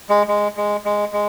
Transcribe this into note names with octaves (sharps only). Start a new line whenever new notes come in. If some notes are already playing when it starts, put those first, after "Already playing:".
G#3
G#3
G#3
G#3
G#3